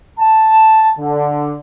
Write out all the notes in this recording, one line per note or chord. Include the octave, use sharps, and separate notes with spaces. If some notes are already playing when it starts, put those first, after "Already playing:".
A5
D3